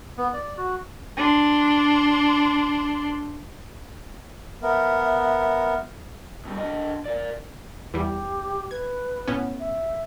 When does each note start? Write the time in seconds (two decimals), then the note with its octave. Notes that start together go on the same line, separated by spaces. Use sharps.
0.18 B3
0.33 D5
0.57 F#4
1.17 D4 C6
4.63 B3 A#4 E5
6.45 B2 G3
6.56 D3 D#5
7.06 A#4 D5
7.94 E2 E3 G3 G4
8.71 B4 G#6
9.28 A2 B3 C#4
9.60 E5